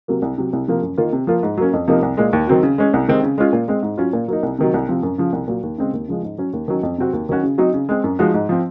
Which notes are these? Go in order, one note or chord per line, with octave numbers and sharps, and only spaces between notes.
C3 F#3 A#3
C2
C3 F#3
C2
C3 F3 A#3
F#2
D#3 A#3 F4
C3
F3 A#3 F4
G#2
F#3 A#3 C#4
F2
C3 F3 A#3 D#4
C2
A#2 G#3
D#2
D#3 F#3 C4 F#4
C#3
G#3 C#4
C2
C3 D#3 G#3 C4
C#3
G#3 C#4 F4
A#2
G#3 C4
G#2
F#3 C#4 F4
A#2
F#3 A#3 D#4
C2
C3 D#3 F#3
C2
C3 F3 C4
F#2
C#3 F3
C2
A#2 F#3
D#2
C#3 G#3 C4
D#2
C#3 F3 G#3 C#4
G#2
F#3 C#4
D#2
D#3 F#3 C#4
F2
C3 F#3 C4 F#4
D#2
D#3 F#3 C#4 F#4
C#3
F#3 C4 D#4 F#4
C#3
G#3 C4
F#2
F3 G#3 D#4 F#4
G#2
F3 C4